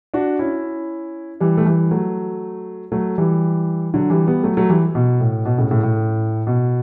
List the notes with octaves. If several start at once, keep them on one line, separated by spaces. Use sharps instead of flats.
D4 F#4
C#4 E4
E3 G3
A3
E3 G3
F#3 A3
F#3 A3
E3 G3
D3 F#3
E3 G3
G3 B3
F#3 A3
F#3 A3
E3 G3
B2
A2
B2
A2 C#3
A2 C#3
A2
B2